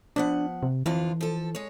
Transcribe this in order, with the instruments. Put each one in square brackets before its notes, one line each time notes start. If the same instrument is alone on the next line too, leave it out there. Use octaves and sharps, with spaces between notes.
[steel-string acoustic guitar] F3 B3 F#5 [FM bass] D4
[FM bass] C3
[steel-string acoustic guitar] F2 D3 F4 [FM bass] E3
[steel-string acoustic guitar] F3 A4
G#3 C#5